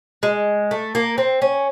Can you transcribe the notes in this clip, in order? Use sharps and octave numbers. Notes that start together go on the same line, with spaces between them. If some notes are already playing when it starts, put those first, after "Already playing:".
G#3
A3
A#3
C4
C#4